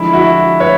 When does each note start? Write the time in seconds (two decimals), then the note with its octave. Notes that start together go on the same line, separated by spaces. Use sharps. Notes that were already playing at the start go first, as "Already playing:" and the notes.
Already playing: D3 F3 G#3 E4
0.13 E4 F#4
0.60 B4 C#5